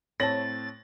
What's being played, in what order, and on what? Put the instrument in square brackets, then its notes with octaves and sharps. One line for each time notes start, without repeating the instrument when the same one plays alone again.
[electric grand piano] A2 C4 [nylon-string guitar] C#5 A5 [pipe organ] A6 [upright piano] A#6 F#7